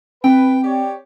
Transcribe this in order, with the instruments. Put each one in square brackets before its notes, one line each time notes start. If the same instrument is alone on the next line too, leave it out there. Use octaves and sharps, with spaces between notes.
[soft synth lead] C4 [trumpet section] B4 [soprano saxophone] G5
[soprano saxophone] G4 [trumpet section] C#5 D5 G5